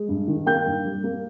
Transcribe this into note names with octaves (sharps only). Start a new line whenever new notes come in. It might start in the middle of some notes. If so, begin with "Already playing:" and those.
Already playing: G#3
G2
D#3
A#3 G5 G6
G2
G3
A#3